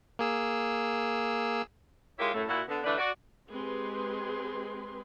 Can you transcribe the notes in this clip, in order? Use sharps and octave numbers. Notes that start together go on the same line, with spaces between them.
A#3 G#4 E6
G#3 E4 F4 G4 A#4 C#5
F#2 A2 A3
A#2 E4 F#4
D3 B3
D3 E3 A3 D4 B4 D5
F#4 D5
G#3 C4 G4 G#4 B4 C6